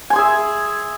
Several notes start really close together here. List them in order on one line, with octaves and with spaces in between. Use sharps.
G#5 C6 G#4 E5